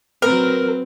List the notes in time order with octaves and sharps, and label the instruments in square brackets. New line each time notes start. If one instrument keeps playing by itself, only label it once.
[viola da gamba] F#3 C4 [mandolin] A#4 [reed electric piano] B4